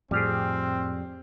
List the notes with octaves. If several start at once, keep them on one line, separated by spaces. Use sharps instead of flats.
F2 A2 G3 C4 G4 G#4 F6